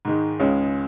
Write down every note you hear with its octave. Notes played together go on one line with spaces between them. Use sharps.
G#2 D#3 G#3
C#2 C#3 G#3 C#4